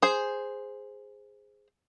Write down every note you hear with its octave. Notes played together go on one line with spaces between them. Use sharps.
G#4 C5